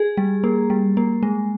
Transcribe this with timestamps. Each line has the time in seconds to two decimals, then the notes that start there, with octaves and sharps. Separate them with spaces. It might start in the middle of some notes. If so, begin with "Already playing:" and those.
Already playing: G#4
0.17 G3
0.44 A#3
0.70 G3
0.97 A#3
1.23 G#3